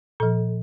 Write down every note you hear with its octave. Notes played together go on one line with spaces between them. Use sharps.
A#2 F3 A4